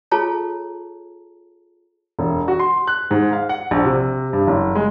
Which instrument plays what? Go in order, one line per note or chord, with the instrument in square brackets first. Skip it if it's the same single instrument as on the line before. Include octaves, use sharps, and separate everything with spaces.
[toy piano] F4 G#4 A4 C#5 A5 A#5
[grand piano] E1
F#4
C6
F#6
G#2
F5
F#5
A#1
C3
G2
F#1
G#3